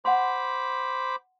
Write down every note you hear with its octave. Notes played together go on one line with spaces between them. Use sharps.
C5 F#5 B5 C6 D6